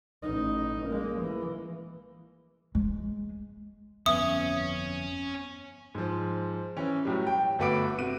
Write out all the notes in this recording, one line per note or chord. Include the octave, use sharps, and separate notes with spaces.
A1 D#4
G#3 A#3
E3
G#3
G1 F2 B3 C#4 E5 D#6
G#2 F3
E3 C#4
A2 F#3 G3
G5
G1 A3 F#4 B4 D6 D7
C3 F#4 D#7